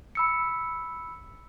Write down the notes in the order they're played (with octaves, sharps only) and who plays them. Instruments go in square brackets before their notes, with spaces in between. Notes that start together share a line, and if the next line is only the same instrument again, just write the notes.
[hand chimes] B5 E6 C#7